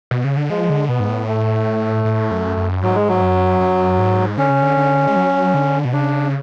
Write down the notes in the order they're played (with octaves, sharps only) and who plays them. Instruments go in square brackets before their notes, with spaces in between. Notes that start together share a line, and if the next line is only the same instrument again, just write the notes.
[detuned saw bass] B2
C#3
D3
[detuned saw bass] F3 [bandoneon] G#3
[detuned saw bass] D3
[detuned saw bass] B2 [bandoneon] B3
[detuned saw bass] G#2
A2
[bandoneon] A3
[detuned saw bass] A2
F#2
F#2
[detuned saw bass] G#2 [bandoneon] F#3
[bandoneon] G#3
F#3
[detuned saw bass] F#2
F#2
G#2
[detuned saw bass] D3 [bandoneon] C#4
[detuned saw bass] C#3
D3
D3
G#3
F#3
D3
B2
[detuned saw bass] C#3 [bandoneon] D4